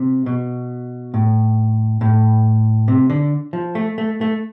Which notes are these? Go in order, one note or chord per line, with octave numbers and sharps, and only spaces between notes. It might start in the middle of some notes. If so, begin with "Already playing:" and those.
Already playing: C3
B2
A2
A2
C3
D3
F3
A3
A3
A3